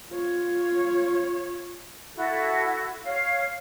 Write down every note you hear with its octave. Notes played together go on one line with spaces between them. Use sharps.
F4 C#5
E4 F#4 A4
C#5 F5